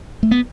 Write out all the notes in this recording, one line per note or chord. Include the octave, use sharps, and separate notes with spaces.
A3
B3